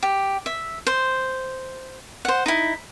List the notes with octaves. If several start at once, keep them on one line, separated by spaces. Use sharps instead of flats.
G4
E5
C5
C5 F#5
D#4 E4